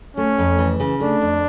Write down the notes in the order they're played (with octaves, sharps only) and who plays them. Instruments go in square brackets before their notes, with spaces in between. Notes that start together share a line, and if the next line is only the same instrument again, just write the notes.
[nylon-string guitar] A3 [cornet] C#4
[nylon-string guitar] F2
E3
C#3
[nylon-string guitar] A3 [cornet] D4
[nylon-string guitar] F2